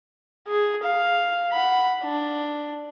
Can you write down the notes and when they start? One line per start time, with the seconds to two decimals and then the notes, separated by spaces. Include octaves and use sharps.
0.49 G#4
0.83 F5
1.52 F#5 B5
2.03 D4